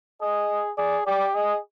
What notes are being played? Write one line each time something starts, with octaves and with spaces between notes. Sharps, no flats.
G#4 D#5
G#4 D5
G4 D5
G#4 D#5